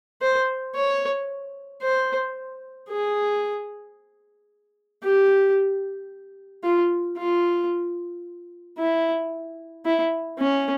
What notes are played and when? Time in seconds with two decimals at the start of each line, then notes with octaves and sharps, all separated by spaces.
0.22 C5
0.75 C#5
1.82 C5
2.89 G#4
5.03 G4
6.64 F4
7.18 F4
8.78 E4
9.85 E4
10.39 C#4